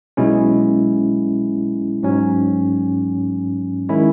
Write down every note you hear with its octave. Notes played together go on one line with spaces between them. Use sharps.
B1 B2 G#3 C#4 E4
G#2 F#3 C#4
D#3 G#3 C#4 E4